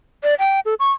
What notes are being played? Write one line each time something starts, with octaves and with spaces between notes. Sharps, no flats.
D5
G5
A4
C#6